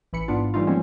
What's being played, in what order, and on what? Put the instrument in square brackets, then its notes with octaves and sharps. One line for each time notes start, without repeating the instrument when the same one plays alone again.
[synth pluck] A1 E3 B5 C#7
G#2 B3 D4 F4
E3 G3 A3 D#4 F4
F3 G3 G#3 A#3 C4 C#4